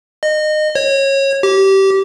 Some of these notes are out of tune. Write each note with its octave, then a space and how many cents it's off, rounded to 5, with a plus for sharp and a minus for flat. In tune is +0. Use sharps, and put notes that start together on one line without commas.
D#5 -25
C#5 -20
G4 -20